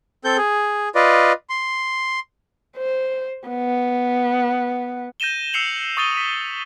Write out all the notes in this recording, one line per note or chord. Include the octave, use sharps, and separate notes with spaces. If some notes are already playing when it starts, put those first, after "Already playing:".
C4 A4 G6
G#4
F4 B4 D5 D#5
C6
C5
B3
G6 A#6 D#7 E7 G7
E6 G6 C7 C#7 F7 F#7
C#6 D#6 A6 D#7 G7
B6